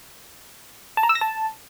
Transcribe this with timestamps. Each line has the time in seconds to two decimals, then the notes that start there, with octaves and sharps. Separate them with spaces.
0.97 A5
1.03 A#5
1.09 E6
1.15 A#6
1.21 A5